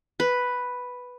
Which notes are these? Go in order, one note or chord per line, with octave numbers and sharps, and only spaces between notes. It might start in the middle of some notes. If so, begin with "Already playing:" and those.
B4